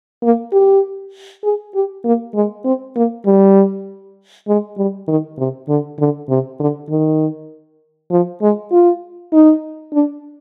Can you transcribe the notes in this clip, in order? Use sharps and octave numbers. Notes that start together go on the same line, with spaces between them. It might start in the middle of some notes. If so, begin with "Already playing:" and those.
A#3
G4
G#4
G4
A#3
G#3
C4
A#3
G3
G#3
G3
D#3
C3
D3
D3
C3
D3
D#3
F3
G#3
F4
D#4
D4